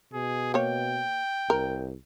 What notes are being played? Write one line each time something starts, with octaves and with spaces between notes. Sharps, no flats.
B2 G#4
A#3 C#5 G5
C2 A#4